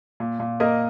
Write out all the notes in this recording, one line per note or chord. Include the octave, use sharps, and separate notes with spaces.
A#2
A#2
A#3 A#4 D#5